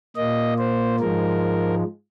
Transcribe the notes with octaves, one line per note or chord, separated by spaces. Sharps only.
A#2 A#3 D#5
C5
G#2 F3 G#3 A#4